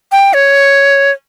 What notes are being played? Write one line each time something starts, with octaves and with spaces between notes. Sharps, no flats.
G5
C#5